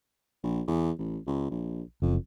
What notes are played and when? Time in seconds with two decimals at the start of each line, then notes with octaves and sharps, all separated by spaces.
0.44 A#1
0.67 E2
0.99 A1
1.27 C#2
1.51 A#1
2.02 F#1 F2